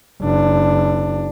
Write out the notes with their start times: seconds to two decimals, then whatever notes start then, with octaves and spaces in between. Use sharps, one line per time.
0.22 F#1 D4